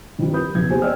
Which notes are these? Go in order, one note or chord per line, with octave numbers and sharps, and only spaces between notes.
G2 D#3 G3 C4 F4
G4 A#4 B4 B5 D#6 G6
F#1 E2 G#6
A#3 B3 G4 G#4 C5 G#5
C5 D5 D#5 G5 E6 F6